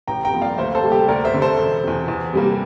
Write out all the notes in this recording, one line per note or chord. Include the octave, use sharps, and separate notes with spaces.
A1 G5 A#5
G5 A#5
G2 F3 A#3
D5 F5
D2 C5 E5
A4 C5
C3 G3 A#3
G4
D2 A#4 D5
C5 E5
D3 A3
A4 C5
E1
E2 C3
E2
C3 G3 A#3